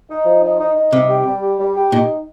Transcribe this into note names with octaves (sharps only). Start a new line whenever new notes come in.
D#4
F3
D#4
D#4
D#4
C3 G3
G4
G3
G4
G3
G4
A#2 D#4